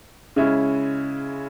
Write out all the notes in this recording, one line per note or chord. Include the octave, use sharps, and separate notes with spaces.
C#3 G#3 C#4 E4